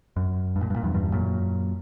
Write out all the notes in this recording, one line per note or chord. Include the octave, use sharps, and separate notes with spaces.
F#2
G2
A#2
G2
A#2
E2 G2
E2 G2
F#2 A#2